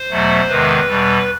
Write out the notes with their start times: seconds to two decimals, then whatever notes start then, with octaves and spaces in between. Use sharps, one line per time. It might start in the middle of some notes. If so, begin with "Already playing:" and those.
Already playing: C5
0.10 E2 B2 F#3 A3
0.48 E2 C3 D#3 G#3 B4
0.87 E2 B2 G3